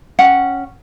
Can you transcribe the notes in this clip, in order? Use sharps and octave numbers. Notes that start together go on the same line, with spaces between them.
C#4 F#5 G5